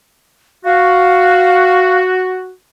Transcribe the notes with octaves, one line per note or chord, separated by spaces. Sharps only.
F#4 F5